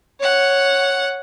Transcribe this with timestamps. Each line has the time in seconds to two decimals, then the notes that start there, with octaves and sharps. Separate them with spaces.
0.20 C#5 F#5